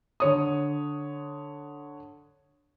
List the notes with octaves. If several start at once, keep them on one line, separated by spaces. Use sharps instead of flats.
D3 C#5 D#6